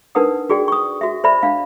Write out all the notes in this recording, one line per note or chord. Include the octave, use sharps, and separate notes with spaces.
D4 D#4 A#4 B4 F#5 D#6
F#4 G#4 D5 G5
C#6 D#6
F#4 E5
C5 D5 E5 B5
D4 F5